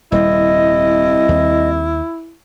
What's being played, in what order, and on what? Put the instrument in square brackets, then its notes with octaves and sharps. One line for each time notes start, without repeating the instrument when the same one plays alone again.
[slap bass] D#1 G3 C4 [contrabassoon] C2 [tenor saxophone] E4 [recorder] D#5
[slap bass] D#2